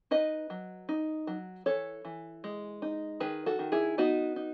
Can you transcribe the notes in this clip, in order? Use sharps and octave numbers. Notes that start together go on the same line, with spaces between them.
D#4 B4 D#5
F#3
D#4
F#3
E3 A4 C#5
E3
G#3
D#4
D#3 G#4 B4
F#4 A4
D#3
E4 G#4
B3 D#4 F#4
D#4